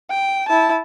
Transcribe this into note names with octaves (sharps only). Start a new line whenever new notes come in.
G5
E4 A5